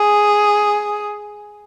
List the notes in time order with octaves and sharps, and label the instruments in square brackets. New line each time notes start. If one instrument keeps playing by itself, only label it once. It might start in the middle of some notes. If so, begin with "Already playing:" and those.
Already playing: [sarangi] G#4